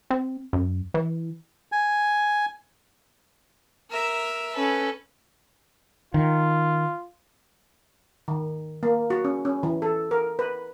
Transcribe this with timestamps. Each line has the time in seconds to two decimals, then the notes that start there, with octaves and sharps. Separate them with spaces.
0.10 C4
0.53 F#2
0.94 E3
1.72 G#5
3.91 A#4 E5
4.55 C#4 A4 B4
6.14 D#3 F4
8.28 D#3
8.83 A#3
9.10 F#4
9.25 C#4
9.45 C#4
9.63 E3
9.82 A4
10.11 A#4
10.39 B4